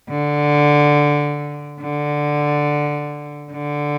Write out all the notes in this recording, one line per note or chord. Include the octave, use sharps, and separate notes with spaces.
D3
D3
D3